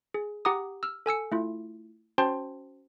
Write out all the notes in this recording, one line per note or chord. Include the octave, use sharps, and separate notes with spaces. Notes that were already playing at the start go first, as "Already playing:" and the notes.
G#4
G4 F#5 A#5 D6 D#6
E6 F6
A4 G#5 E6 C#7
A3 E4 F4
C#4 F#4 C5 G5 A5 C6